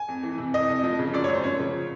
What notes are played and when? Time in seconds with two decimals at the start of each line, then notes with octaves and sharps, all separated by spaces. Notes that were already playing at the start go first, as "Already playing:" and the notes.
Already playing: G#5
0.08 F2
0.23 E3
0.38 C3
0.54 F2 D#5
0.69 F2
0.84 F3
0.99 C#3
1.13 F#2 D5
1.24 C#5
1.29 F#2
1.34 C5
1.44 F3 C#5
1.59 C#3